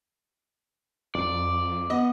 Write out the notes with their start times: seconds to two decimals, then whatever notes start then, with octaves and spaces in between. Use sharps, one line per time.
1.15 F2 D5
1.90 B3 D#5